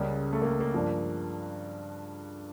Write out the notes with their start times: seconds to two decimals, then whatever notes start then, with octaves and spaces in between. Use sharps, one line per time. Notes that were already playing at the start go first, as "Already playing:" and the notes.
Already playing: C#2 C#3 G3 A#3
0.33 A3
0.42 A#3
0.46 A3
0.60 A#3
0.74 G2 F3